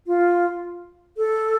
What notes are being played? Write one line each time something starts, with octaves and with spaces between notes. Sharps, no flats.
F4
A4